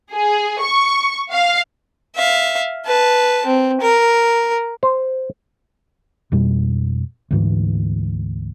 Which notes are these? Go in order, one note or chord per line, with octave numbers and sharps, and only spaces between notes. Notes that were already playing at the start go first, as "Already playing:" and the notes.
G#4
C#6
F5
E5 F5
B4 A5
C4
A#4
C5
F2 B2 G3
D2 G#2 E3